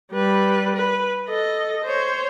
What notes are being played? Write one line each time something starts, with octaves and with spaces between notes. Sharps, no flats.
G3 B4
B4
A4 D#5
C5 C#5